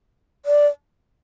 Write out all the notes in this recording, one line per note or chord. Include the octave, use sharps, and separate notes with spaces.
D5